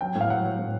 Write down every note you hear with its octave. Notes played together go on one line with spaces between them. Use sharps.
F#3 G5
A2
F5
F#3 F#5
F#3
A2